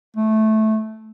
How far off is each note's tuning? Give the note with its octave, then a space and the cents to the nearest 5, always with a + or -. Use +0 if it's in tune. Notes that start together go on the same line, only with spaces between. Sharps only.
A3 -10